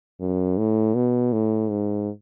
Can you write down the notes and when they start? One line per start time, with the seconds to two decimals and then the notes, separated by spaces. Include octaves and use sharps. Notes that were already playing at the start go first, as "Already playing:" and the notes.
0.21 F#2
0.58 A2
0.95 B2
1.33 A2
1.70 G#2